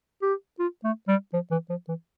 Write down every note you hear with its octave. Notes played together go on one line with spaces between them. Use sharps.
G4
F4
A3
G3
F3
E3
F3
E3